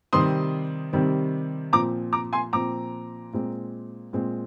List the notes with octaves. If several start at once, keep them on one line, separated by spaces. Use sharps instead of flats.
C3 D#3 G3 C4 C6 D#6
C3 D#3 G3 C4
A#2 F3 C4 A#5 D6
A#5 D6
G#5 C6
A#2 F3 C4 A#5 D6
A#2 G#3 C4
A#2 G#3 C4